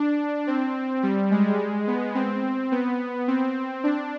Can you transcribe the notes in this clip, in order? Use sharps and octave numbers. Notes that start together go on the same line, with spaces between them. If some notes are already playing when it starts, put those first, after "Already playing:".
Already playing: D4
C4
G3
G#3
B3
C4
B3
C4
D4